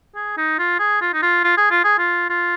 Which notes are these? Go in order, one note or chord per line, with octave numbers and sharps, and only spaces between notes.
G#4
D#4
F4
G#4
F4
D#4
F4
F4
G#4
F4
G#4
F4
F4